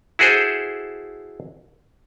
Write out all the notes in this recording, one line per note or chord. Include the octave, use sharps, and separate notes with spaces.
E4 F#4 G#4 A4 C5